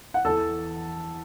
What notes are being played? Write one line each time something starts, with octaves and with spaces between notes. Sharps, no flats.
F#5
E2 E3 A4 A5